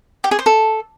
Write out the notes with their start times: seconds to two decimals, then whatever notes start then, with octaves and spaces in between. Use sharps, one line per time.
0.24 G4
0.31 G#4
0.39 C5
0.46 A4